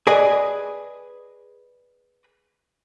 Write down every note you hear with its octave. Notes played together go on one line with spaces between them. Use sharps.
G#4 B4 D5 D#5 G#5